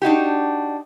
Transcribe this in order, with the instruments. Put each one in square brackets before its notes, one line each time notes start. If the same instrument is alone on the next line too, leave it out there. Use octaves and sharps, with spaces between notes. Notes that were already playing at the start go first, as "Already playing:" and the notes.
[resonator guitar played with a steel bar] D4 D#4 F#4 G4